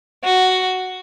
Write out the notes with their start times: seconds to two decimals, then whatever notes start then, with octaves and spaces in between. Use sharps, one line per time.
0.24 F#4